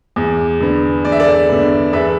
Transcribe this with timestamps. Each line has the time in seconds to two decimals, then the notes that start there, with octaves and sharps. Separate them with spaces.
0.16 E2
0.60 D3 B3
1.05 E2 D5
1.12 E5
1.20 A4 D5
1.49 D3 B3
1.93 E2 B4 E5